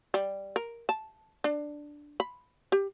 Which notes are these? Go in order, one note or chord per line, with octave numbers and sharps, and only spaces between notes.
G3
A#4
A5
D4
B5
G4